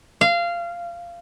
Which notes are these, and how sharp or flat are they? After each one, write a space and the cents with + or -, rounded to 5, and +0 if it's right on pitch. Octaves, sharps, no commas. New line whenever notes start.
F5 -20